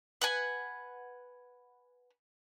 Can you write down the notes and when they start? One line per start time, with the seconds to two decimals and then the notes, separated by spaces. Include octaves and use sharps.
0.22 B4 F#5 G#5